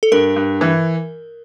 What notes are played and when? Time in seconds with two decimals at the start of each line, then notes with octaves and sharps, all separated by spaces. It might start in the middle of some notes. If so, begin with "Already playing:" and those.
0.03 A4
0.12 G2 A#4
0.36 G2
0.61 E3